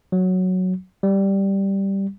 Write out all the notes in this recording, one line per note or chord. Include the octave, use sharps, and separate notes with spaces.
F#3
G3